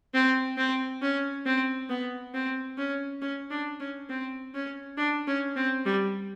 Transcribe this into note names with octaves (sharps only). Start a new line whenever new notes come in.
C4
C4
C#4
C4
B3
C4
C#4
C#4
D4
C#4
C4
C#4
D4
C#4
C4
G3